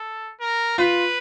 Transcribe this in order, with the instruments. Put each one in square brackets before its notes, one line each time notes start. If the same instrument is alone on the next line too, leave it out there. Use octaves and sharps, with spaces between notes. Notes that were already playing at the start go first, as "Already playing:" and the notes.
Already playing: [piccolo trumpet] A4
A#4
[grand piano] F4 [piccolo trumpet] B4